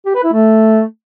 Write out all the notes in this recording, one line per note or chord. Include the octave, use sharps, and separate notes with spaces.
G4
B4
E4
A3